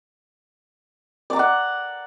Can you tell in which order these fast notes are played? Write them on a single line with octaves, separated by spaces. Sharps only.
D5 A#5 D6 F#5